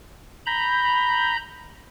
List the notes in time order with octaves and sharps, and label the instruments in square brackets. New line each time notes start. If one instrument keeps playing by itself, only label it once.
[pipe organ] A#5 B5 G6